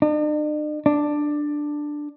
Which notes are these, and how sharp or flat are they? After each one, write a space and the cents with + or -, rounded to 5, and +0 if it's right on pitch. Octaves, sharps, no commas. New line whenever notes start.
D4 +45
D4 +10